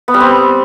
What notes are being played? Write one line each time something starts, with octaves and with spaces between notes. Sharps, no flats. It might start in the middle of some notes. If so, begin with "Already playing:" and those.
B3
G3
C4